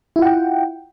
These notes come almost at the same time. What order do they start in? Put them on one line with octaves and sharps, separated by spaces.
E4 F4 F#5 G5